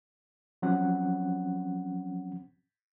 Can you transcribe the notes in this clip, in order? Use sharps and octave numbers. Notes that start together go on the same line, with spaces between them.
F3 F#3 C4 C#4 F#5